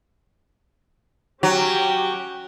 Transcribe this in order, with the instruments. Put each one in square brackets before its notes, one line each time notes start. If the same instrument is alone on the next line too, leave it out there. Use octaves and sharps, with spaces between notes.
[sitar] F#3 [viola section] C#4 G4 G5